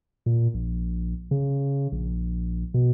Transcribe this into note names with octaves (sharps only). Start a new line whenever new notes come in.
A#2
A#1
C#3
A#1
B2